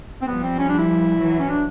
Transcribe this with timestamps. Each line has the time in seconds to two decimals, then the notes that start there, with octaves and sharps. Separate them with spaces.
0.22 C4
0.28 F3 G3 B3
0.43 C4
0.59 C#4
0.69 D4
0.78 E4
1.19 E3 F#3
1.39 C#4
1.49 D4